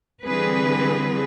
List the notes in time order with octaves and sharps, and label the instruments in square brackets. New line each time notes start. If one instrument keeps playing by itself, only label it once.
[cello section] D3 E3 G3 C4 G#4 B4